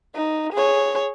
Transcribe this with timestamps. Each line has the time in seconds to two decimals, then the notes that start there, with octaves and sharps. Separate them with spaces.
0.15 D#4
0.53 G#4 C#5